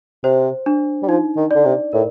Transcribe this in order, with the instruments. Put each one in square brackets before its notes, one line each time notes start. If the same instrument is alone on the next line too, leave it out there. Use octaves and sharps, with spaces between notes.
[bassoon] C3 [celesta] C5
[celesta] D4
[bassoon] G3
[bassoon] F3 [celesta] D#4
[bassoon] D#3
[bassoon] D3 [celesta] D5
[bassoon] C3
[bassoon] A2 [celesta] A#4